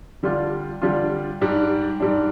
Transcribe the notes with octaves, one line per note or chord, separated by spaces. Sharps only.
D3 G3 D4 F4
D3 G3 D4 F4
G#2 G3 D4
G#2 G3 D4